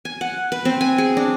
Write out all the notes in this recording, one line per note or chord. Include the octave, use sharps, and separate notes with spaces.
G#5
F#5
B4
C4
G#5
G#4
D4